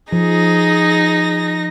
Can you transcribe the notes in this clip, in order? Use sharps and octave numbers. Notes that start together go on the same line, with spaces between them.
F3 D#4 G#4 A#6